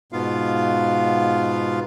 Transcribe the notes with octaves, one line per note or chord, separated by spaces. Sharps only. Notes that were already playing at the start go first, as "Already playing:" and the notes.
G#2 B2 B3 F4 F5